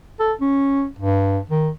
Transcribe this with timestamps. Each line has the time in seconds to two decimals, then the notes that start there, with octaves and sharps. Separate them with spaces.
0.20 A4
0.41 C#4
0.99 G2
1.50 D#3